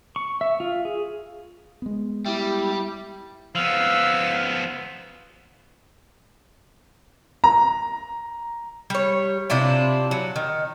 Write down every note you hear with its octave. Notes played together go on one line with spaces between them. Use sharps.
C#6
E5
F4
G#4
G#3 B3
G3 E4 G4
F3 B3 F5 E6
A#5
G3 C#5
C3 D4 E4 F4
F#3
D#3